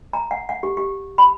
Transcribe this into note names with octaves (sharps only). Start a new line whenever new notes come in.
A#5
F#5
F#5
G4
G4
B5